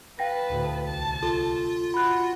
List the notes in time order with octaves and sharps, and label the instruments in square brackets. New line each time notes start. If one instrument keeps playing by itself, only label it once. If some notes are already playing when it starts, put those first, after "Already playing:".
[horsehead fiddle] B4 A5 [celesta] F5 G5 A#6
[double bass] D2 A2
[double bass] C2 [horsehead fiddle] A5
[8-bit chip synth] F4 [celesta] A4
[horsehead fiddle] F#4 [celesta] B5 F#6